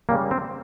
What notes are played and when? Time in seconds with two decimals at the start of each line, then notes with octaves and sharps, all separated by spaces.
0.09 C#3 G3 A#3
0.31 C4